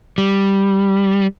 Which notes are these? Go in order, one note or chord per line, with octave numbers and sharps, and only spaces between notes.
G3